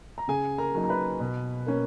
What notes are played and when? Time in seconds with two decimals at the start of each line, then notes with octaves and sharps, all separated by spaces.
0.18 A#5
0.28 C#3 G#4 G#5
0.58 A#4 A#5
0.75 F#3 A#3 D#4
0.84 A#5
0.89 B4 B5
1.20 B2
1.67 A#3 C#4